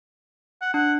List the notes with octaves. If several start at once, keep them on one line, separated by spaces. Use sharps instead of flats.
F#5
D4 F#5